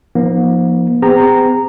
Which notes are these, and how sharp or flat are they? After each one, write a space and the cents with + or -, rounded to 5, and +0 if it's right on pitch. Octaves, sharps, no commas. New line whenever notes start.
F3 +0 A#3 +45 D#4 +0
C4 -45 G#4 -45 A#5 -10